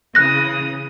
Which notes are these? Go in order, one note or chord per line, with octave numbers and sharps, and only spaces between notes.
C#3 E3 D#6 F#6 A#6